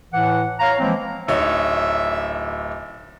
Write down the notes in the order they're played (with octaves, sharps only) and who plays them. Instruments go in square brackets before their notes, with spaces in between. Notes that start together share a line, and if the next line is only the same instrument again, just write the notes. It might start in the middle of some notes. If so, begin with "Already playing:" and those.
[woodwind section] A2 E3 F#5
C#5 F5 A#5
E3 F3 G#3 A#3 C4
[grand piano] D1 D#4 C#5 [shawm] E5